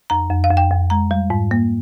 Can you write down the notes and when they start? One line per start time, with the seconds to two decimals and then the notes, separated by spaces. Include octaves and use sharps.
0.10 F2 A#5
0.30 F2
0.44 F5
0.50 F2
0.57 G5
0.71 F2
0.90 G#3 A#5
1.11 G3
1.30 G#2
1.51 A#3